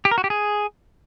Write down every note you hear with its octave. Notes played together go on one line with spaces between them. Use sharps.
G4
A#4
F#4
G4
G#4